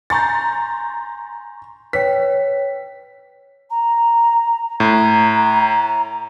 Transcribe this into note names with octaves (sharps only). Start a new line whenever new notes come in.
G#5 A#5 C6 C#6 G6 A6
B4 C#5 G5 B6
A#5
A2 A#5